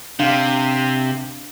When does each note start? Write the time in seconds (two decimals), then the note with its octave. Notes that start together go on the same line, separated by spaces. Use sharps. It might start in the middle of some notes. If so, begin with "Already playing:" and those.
0.19 C3 D4 F5